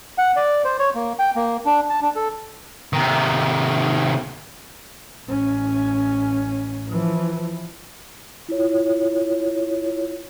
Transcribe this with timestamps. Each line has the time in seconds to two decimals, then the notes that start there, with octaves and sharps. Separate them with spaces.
0.18 F#5
0.36 D5
0.64 C5
0.79 C#5
0.95 A#3
1.19 G5
1.36 A#3
1.66 D4
1.89 A5
2.02 D4
2.16 A4
2.93 C3 D#3
5.26 A1 C#4
6.90 E3 F3
8.49 E4 F4 C#5